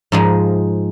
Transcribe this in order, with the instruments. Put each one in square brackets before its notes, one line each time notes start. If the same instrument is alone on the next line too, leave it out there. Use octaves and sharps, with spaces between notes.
[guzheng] G#2 F3 G#3